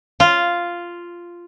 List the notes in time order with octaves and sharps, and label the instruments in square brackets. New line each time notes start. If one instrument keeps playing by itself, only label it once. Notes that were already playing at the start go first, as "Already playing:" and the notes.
[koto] F4